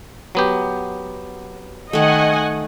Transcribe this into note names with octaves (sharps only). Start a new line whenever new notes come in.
F#3 B3 G4
D#3 A3 D#5 F#5 G#5